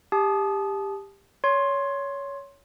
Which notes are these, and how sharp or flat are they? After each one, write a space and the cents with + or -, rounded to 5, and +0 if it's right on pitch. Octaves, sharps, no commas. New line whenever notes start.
G4 +20 A5 -35 D#6 +0
C#5 +15 C6 +15